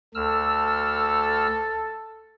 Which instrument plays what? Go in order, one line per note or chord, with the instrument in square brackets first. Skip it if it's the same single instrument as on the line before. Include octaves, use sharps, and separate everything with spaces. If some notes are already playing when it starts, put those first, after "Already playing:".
[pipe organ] D2 E6 F6 [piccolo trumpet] A4